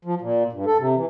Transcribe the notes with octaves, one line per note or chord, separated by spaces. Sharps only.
F3
A#2
G2
A4
C3
E3